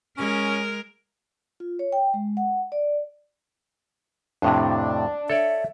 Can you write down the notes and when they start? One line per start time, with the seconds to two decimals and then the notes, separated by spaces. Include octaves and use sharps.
0.18 G#3 C#4 A#4
1.60 F4
1.79 C#5
1.92 G5
2.14 G#3
2.37 F#5
2.72 D5
4.42 F2 A2 C3 D4
5.30 A4 C#5 D5 E5